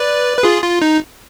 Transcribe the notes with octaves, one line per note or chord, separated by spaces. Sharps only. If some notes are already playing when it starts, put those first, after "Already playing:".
Already playing: B4 D5
B4
F4 G#4
F4
D#4